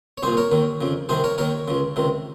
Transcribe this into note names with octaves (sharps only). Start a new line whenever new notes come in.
C#5
C2 A#2 G#4 C5
A#4 C#5
D#2 D#3
F2 C#3
C2 C3 D#3 G#4 C5
A#4 C#5
D#2 D#3 A#4 C#5
C#2 C#3
C#2 C3 D#3